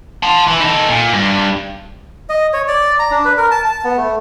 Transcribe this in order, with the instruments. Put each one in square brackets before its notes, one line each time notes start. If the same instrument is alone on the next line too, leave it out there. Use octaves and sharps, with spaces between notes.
[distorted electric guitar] A5 C6
E3
D#4 A4
A#2
G2
[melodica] D#5
C#5
D5
A#5
D4
B4
A#4
A5
A5
B3
A3